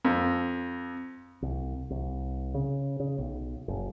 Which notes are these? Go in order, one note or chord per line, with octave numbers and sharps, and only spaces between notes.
F2
C2
C2
C#3
C#3
B1
F#1